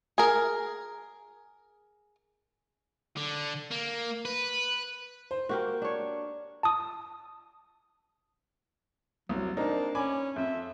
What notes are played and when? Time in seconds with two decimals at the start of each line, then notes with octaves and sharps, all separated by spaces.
0.18 G#4 A#4
3.17 D3
3.71 A#3
4.25 B4
5.31 C5
5.49 A#3 F#4 G4 A#4
5.82 D4 C#5
6.63 A5 D#6
9.29 C2 F#3
9.57 A#3 C4 D4 D#4
9.95 C#4 G#5 B5 D6
10.36 F2 E5